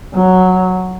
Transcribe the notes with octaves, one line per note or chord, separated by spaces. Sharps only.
F#3